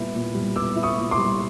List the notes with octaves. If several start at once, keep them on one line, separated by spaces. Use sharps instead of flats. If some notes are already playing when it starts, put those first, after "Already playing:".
Already playing: A#2 G3 B3 E4
A#2
G3
B3 D6 E6
E4
C#6 D#6
A#2
C6 D6
G3